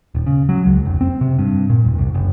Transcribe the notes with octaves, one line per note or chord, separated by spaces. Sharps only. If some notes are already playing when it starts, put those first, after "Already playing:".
D#1
C#3
F#3
C#2
F1
C4
C3
G2
A#2
E1
C2
F#1